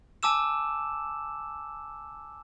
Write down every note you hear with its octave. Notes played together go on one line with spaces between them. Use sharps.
G#5 A5 D6 E6 E7